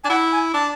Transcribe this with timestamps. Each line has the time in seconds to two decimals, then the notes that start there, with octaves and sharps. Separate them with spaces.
0.04 D4 G#5
0.09 E4 F#5
0.32 G#5
0.54 D4 A5